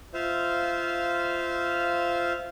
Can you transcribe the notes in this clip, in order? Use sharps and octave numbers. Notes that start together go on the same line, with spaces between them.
F4 C5 E5 F5